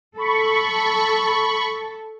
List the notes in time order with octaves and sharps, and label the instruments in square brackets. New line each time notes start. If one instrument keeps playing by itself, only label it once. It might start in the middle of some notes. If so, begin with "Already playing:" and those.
[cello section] A4 [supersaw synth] B5 C#6